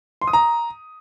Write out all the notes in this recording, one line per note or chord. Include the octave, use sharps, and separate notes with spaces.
C6
D#6
A#5